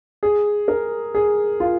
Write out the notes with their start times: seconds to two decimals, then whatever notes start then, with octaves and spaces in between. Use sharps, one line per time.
0.23 G#4
0.68 A#4
1.15 G#4
1.60 F4